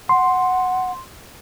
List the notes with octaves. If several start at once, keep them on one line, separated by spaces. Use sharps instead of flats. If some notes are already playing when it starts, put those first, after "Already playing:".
F#5 C6